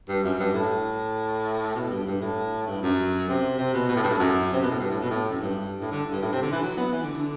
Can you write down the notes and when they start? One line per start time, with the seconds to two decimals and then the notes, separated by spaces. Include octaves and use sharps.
0.08 G2
0.23 F#2
0.39 G2
0.53 A2
1.75 B2
1.90 G2
2.06 G2
2.21 A2
2.67 G2
2.82 F#2
3.28 C3
3.58 C3
3.74 B2
3.88 B2
3.96 A2
4.03 G2
4.10 A2
4.19 F#2
4.53 C3
4.61 B2
4.70 A2
4.79 G2
4.90 A2
5.00 B2
5.10 A2
5.30 F#2
5.40 G2
5.81 A2
5.91 D3
6.11 G2
6.22 A2
6.32 C3
6.42 D3
6.52 E3
6.62 F#3
6.77 B3
6.92 E3
7.03 D3
7.13 D3